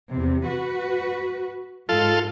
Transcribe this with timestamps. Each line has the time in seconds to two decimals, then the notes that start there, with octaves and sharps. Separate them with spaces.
0.12 E2 C3
0.46 F#4 B4
1.89 G#2 F4 A4